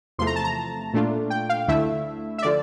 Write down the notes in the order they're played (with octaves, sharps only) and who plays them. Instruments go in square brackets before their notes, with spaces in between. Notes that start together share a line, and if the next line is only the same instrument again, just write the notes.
[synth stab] E2 C3 F3 A3 C6
A#5
A5
A#5
A#2 A3 D4 F4
G5
F5
D2 D3 A3 E4 E5
E5
D3 F3 D5